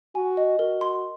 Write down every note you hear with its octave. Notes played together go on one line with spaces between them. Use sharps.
F#4 G#5
D#5
F#4 A#4
C6